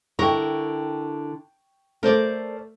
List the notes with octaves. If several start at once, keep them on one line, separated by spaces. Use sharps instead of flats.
D3 E4 A#4 G5 C#6
A3 A#4 C5 D5